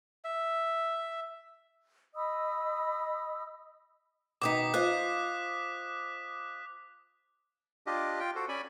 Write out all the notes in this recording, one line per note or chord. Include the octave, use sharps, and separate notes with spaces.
E5
D#5 B5 D#6 E6
B2 D#3 D#4 D6 D#6 B6
F4 C5 D#5 F#6
D4 F4 G4 D#5
F4 G5
F#4 A4 C5
C#4 D5 G#5 B5